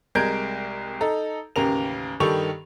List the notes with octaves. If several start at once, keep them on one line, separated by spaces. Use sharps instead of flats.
C2 G#3 A#4 G6 G#6 D7
D#4 A4 A#5
A1 D#2 C#3 A#4 F7
G2 D#3 G4 A4 C#6 F7